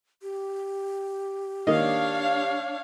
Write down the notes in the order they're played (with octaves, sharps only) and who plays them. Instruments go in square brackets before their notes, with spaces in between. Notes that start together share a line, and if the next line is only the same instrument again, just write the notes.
[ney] G4
[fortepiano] D#3 A#3 D#5 [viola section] D4 C#5 F5